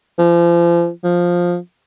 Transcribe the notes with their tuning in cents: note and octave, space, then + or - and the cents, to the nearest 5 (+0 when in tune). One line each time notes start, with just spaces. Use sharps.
F3 -35
F3 +10